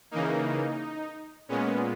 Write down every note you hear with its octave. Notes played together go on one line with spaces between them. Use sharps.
C#3 E3 A#3 D#4
A#2 G#3 B3 C#4